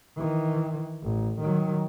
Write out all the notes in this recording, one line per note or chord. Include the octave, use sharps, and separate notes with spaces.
D#3 E3
A1
D#3 F#3